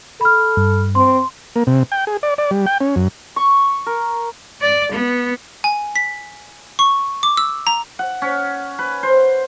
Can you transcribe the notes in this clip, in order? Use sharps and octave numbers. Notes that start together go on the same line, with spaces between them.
A4 B5 F6
G2
C4 C6
A#3
C3
G5
G#4
D5
D5
G3
G5
C#4
F#2
C#6
A#4
D5
B3
G#5
B6
C#6
D6
E6
A#5
F#5
C#4
B4
C5